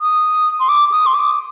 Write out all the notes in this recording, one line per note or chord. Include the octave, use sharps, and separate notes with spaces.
D#6
C6
D6
D#6
C6
D6